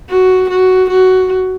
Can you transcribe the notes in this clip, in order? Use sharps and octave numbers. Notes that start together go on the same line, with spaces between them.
F#4
F#4
F#4